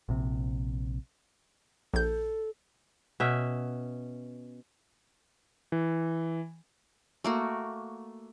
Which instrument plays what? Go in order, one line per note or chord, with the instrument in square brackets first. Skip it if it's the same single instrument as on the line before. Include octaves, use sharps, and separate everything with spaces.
[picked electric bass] A#1 C3
[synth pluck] A#1 G6 [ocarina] A4
[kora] B2 C#4 E5
[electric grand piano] E3
[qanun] A3 A#3 F#4